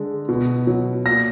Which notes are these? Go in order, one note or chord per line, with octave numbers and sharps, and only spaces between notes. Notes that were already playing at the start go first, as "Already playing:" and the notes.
Already playing: D3 G#3
B2
F#3
A#2 A#6